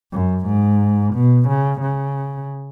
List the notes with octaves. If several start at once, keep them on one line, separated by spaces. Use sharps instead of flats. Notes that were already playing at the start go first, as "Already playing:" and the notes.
F#2
G#2
B2
C#3
C#3